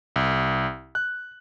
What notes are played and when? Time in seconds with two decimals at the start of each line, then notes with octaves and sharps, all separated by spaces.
0.16 C2
0.95 F#6